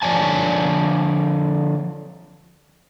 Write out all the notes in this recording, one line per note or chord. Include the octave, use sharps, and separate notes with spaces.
D3 F3 C#5 D5 G#5 A5